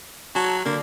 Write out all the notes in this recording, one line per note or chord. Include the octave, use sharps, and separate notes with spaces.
F#3 A5
D3 A#3